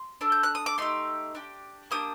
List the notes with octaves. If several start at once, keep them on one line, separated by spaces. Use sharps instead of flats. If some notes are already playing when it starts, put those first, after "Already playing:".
Already playing: C6
D4 A4
G6
F#6
D#6
D6
A3 D#4 G4 C6
D4 G4
A#3 D4 G4 D#6